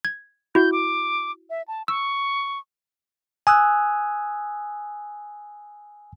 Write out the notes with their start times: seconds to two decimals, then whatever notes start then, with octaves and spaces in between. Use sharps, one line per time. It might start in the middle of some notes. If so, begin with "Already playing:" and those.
0.05 G#6
0.55 E4 F#4 G6
0.72 D6
1.50 E5
1.68 A5
1.88 C#6 E6
3.47 G#5 D#6 E6 F#6